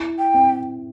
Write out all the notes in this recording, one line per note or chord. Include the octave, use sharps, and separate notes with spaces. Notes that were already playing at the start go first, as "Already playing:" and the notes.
Already playing: E4
G5
C4